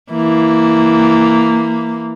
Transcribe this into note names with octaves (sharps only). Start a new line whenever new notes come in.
E3 A#3